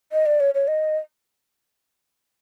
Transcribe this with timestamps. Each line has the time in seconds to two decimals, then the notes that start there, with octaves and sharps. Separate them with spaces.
0.12 D#5
0.26 D5
0.40 C#5
0.55 C#5
0.68 D#5